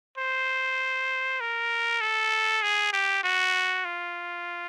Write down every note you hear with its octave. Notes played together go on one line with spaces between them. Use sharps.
C5
A#4
A4
G#4
G4
F#4
F4